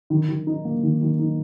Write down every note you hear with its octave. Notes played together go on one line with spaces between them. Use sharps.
D#3
D#3
D#4
A#3
D#3
D#3
D#4